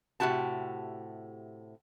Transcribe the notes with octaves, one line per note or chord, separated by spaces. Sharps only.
A2 C3 F#4 G4 A5